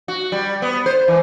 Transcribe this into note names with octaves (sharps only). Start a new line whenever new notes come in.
F#4
G3
B3
C5
E3